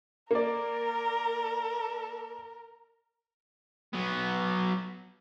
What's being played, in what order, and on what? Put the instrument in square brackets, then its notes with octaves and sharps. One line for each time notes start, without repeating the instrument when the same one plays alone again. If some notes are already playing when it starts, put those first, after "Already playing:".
[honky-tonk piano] A#3 D5 [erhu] A#4
[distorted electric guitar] F#3 B3